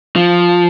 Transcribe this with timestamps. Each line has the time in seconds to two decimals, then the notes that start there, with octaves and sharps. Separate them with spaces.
0.16 F3